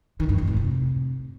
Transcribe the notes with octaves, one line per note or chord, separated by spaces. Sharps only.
D#3
G2
F2
A2
C3